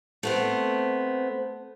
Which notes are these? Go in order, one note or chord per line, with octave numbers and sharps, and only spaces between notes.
A3 B3 C4